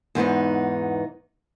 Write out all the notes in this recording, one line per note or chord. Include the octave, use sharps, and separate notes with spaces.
E2 G#2 B3 D#4